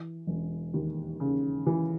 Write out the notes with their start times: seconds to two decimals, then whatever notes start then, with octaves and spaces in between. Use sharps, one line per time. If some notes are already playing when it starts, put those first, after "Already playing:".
Already playing: E3
0.27 E1
0.74 D#2
1.20 C#3
1.66 E3